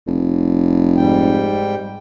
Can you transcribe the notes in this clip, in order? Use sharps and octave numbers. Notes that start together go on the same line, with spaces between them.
F1
G#2 G3 G5